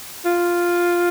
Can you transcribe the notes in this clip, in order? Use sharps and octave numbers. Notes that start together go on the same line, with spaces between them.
F4